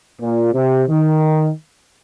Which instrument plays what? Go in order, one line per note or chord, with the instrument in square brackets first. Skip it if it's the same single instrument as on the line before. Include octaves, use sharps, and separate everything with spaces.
[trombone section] A#2
C3
D#3